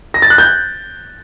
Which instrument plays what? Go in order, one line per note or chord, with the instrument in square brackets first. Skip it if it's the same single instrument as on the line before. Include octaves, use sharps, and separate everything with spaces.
[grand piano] A#6
A6
F#6
G6